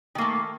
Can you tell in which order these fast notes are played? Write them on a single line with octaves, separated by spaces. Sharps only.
D#3 A#3 A3